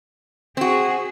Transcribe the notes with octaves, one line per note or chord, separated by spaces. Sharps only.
C4 F#4 G#4